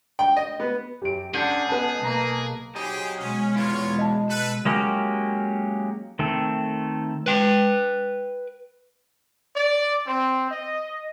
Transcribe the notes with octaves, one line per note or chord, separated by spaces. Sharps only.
G5
D#5
B3
F#2 G4 D7
C#4 D4 G#4 A4 F#5 G6
B3 B4 D#5 A5
B1 A#3 A#5
F#3 G4 G#4 C5 D#5
B2 G#3 C#4
E2 E3 F4 C#5
D#5 A5
A4 B4
F#3 G#3 A#3 C#4 G4
D#3 A3 C4 A4
B4 G5
D5
C4
D#5